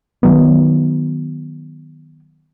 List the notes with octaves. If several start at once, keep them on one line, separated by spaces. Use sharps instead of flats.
D#3 F#3 B3